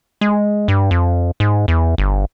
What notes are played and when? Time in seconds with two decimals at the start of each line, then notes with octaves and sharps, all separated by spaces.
0.21 G#3
0.68 G2
0.91 F2
1.40 G#2
1.68 E2
1.98 G1